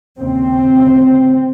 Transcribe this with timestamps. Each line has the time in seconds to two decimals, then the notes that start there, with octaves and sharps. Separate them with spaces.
0.20 D#2 C#3 C4
0.71 D2
0.76 C#3